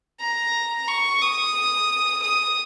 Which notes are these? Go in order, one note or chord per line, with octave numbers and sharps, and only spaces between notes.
A#5
C#6
D#6
D#6